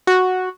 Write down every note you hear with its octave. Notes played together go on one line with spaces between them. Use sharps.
F#4